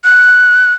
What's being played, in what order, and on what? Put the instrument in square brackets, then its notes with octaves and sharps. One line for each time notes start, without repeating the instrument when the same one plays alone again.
[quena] F#6